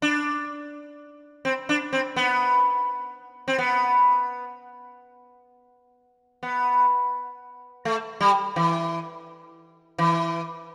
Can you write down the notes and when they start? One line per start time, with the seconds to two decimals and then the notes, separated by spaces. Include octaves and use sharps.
0.02 D4
1.45 C4
1.69 D4
1.93 C4
2.16 B3
3.48 C4
3.58 B3
6.43 B3
7.85 A3
8.21 G3
8.56 E3
9.98 E3